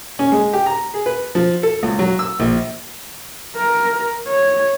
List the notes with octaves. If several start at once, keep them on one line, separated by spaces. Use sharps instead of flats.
C#4
G#3
G4
A#5
G#4
B4
F3
A4
C#2
F#3
E6
A#1
A#4
C#5